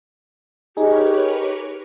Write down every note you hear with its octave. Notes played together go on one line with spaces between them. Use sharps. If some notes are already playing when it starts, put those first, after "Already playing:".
D#4 G4 G#4 A#4 B4 C#5